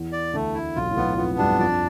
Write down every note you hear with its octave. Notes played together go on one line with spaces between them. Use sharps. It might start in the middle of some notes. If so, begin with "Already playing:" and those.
Already playing: E2 E3
D5
D2 D3 A3
E4
B1 B2 F4
A2
B1 B2 B3
F2 F3 B3
G2 G3 D4
F2 F3 D5